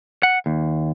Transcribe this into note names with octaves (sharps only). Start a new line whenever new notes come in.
F#5
D#2